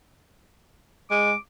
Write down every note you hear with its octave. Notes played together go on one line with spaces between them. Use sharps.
G#3 D6